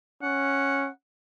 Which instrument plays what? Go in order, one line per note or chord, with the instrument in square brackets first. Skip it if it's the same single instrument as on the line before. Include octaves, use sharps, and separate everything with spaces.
[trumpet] C#4 [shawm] F#5